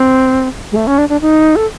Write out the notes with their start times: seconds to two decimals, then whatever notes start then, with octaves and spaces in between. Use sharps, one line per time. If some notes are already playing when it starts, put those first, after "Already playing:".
Already playing: C4
0.72 G#3
0.76 A3
0.87 C#4
0.98 D4
1.09 D4
1.21 D#4
1.56 A4